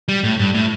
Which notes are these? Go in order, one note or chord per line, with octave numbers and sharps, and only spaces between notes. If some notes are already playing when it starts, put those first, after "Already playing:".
G3
A2
G2
A2